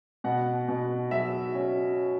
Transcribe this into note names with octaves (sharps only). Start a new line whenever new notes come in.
B2 F#5
B2
F#3 E5
C#4